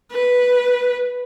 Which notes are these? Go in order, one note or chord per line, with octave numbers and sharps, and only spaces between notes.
B4